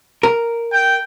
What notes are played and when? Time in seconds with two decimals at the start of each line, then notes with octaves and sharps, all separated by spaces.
0.23 A#4
0.73 G5